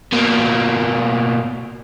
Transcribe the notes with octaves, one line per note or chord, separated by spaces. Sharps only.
B2 A#3